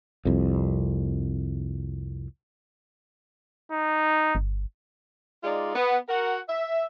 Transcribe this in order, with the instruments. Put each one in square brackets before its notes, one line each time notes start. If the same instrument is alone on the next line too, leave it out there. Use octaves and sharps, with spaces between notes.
[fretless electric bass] C2 F2
[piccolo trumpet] D#4
[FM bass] G1
[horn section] G#3 D#4 F4 D5
B3
F#4 A#4 F#5
E5